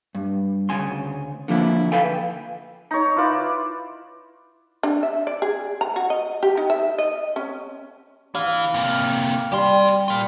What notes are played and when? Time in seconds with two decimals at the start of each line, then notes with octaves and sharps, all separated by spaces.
0.15 G2
0.69 D2 C#3 G#5 C6
1.48 D3 F3 A#3 E4
1.92 A4 B4 E5 F5 G5 G#5
2.91 D#4 C#5
3.16 E4 F4 B4 D5
4.83 D4
5.03 E5
5.27 D5
5.42 G#4
5.81 A#5
5.96 F#4
6.10 D#5
6.43 G4
6.57 D#4
6.70 E5
6.98 D#5
7.36 C#4
8.35 E3 F5
8.74 C3 A#3
9.52 G3 G4 C6
10.08 F4 A#4